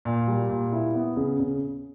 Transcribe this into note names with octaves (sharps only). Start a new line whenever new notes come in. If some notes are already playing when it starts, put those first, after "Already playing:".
A#2
G3
A#2
E4
B3
C#3
C#3